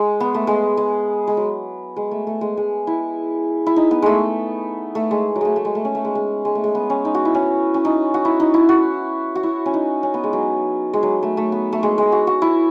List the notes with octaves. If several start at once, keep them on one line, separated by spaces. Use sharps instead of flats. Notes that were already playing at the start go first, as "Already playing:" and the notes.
Already playing: G#3
B3
A3
G#3
G#3
G#3
F#3
G#3
A3
A3
G#3
G#3
E4
E4
D#4
B3
G#3 A3
A3
G#3
F#3
G#3 A3
A3
G#3
A3
C#4
A3
G#3
G#3
G#3
A3
G#3
B3
C#4
D#4
F#4
E4
C#4
C#4
D#4
F#4
E4
D#4
E4
F#4
F#4
E4
C#4
D#4
C#4
B3
G#3
F#3
G#3
F#3
A3
A3
B3
A3
G#3
G#3
F#4
F#4
E4